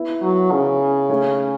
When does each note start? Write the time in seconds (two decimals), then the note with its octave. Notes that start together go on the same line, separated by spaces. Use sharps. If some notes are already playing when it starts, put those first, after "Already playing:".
Already playing: B3 E4
0.22 F#3
0.52 C#3
1.09 A3 C#4